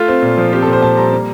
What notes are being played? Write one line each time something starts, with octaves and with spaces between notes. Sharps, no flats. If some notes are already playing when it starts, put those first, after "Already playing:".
Already playing: A3 F4
C4
A#2
F3
C4 G4
A4
A#2
C5
A#2 A5
G3 A#5
A#3